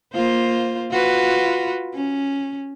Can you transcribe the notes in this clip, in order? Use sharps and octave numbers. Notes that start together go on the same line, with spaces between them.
A#3 F4 C5
F4 F#4 B4
C#4